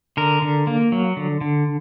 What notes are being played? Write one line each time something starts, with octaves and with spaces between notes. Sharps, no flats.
D3 A#4
D3
A#3
F#3
D3
D3